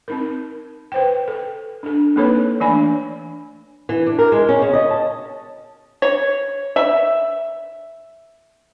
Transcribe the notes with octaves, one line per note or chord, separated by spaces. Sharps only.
C4 D#4 A#4
B4 C5 G5
A4
D4 A4
A#3 C4 D#4 A4 B4 C#5
E3 A3 D4 D5 G#5 B5
E3
D4
A#4
G#3
C#4
C#3
D#5
A5
C#5
E5